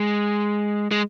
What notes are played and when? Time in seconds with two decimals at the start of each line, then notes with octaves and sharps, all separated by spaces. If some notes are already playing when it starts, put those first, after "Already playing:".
Already playing: G#3
0.91 G#3